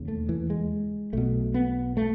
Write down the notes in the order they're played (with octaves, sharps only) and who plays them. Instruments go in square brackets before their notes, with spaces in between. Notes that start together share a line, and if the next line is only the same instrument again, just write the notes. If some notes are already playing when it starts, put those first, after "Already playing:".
Already playing: [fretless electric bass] E1 D#2 C#3
A3
E3
G#3
B1 B2 A3
B3
A3